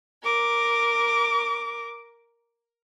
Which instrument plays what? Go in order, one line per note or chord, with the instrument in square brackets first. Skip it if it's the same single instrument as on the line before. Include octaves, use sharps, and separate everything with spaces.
[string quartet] A#4 D6